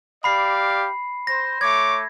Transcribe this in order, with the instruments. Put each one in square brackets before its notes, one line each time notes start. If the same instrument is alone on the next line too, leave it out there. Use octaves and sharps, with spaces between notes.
[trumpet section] G4 D5 F5 [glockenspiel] B5 C7
[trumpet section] C5 [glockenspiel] A#6
[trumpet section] A3 C#5 D6 [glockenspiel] G#6